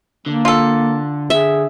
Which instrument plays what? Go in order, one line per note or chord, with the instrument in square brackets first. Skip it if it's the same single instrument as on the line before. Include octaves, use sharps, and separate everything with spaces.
[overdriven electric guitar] D3 [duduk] A#3
[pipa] F4 A4
[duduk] G#4 [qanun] E5